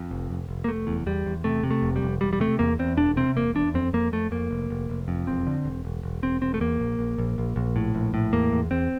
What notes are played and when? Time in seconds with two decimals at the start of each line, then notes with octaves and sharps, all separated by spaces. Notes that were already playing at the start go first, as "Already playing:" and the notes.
Already playing: F2
0.11 F1
0.30 F1
0.49 F1
0.64 A#3
0.68 F1 A3
0.87 E2
1.06 E2 G3
1.26 E2
1.44 C3 A3
1.63 C3
1.71 A3
1.83 F1
1.96 G3
2.03 F1
2.21 E1 G3
2.33 G3
2.40 C3 A3
2.59 E2 A#3
2.79 E2 C4
2.97 E1 D4
3.17 C3 C4
3.36 E1 A#3
3.55 E2 D4
3.74 F2 C4
3.93 F2 A#3
4.12 F2 A3
4.31 F2 A#3
4.51 F1
4.70 F1
4.90 F1
5.08 F2
5.26 E1 C4
5.47 D3
5.65 E1
5.85 E1
6.03 E1
6.23 E1 C4
6.41 E1 C4
6.54 A3
6.60 E2 A#3
6.80 A#1
6.99 A#1
7.18 A#1
7.38 A#1
7.56 A#1
7.76 A2
7.95 A#1
8.14 A2
8.33 E2 A#3
8.52 E2
8.71 E2 C4